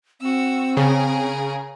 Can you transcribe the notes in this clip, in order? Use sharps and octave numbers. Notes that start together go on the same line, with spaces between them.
C4 F#4 E6
C#3 G#4 A#4